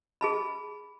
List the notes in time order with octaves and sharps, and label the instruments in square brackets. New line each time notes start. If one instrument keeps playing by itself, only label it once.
[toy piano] G#4 A5 B5